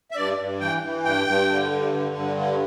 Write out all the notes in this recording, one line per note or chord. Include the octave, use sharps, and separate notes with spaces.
E5
G2 D5
G2
E3 G5
E3
G2 G5
G2
D3
G2
D3
G2
D3